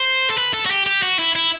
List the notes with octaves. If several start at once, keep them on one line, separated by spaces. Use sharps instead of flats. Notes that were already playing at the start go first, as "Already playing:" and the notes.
Already playing: C5
A4
B4
A4
F#4
G4
G4
F#4
E4
E4